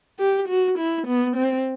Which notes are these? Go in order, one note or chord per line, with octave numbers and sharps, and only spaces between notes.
G4
F#4
E4
B3
C4